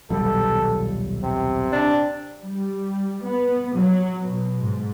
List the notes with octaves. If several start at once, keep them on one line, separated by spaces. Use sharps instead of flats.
D#1 B1 G3 A4
C3
D4
G3
B3
F#3
B2
G#2